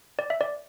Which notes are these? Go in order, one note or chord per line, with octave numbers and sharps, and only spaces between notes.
D5
E5
D5